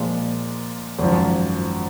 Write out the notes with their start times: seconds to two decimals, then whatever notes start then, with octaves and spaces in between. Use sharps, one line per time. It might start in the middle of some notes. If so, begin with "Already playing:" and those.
Already playing: A#2 F3 G#3
0.99 G#1 F#2 F3